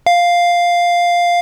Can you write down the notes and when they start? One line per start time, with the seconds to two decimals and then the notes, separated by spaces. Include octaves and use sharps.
0.06 F5